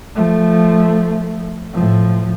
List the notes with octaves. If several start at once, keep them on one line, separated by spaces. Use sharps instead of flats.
F3 A3
A2 F3